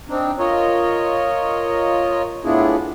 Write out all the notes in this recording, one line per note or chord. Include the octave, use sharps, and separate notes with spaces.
C4 D4 D#4
F4 A#4 C#5 D#5
A2 B3 D4 E4 F4 G#4